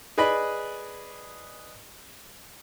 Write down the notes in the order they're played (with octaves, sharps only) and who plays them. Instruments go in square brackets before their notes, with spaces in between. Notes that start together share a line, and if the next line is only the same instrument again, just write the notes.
[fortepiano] G#4 B4 D5 D#5 B5